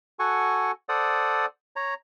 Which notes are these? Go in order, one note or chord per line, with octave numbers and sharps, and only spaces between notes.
F#4 A4 F#5 G#5 C#6
A4 C5 D5 F#5 D#6
C#5 A#5